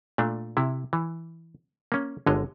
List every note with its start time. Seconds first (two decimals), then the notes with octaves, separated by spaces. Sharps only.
0.18 A#2 A3 D4
0.57 C3 E4
0.93 E3
1.92 A#3 C#4
2.26 G1 D3 G#3 C#5 D#5